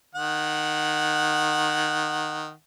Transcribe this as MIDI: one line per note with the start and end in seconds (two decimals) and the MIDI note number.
0.15 2.52 51
0.15 2.52 78